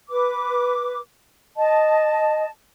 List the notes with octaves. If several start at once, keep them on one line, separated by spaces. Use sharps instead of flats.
B4 D6
D#5 A5